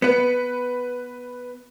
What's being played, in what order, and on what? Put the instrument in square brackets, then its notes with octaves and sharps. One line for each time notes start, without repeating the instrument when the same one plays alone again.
[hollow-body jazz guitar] B3 [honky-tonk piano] B4 C#7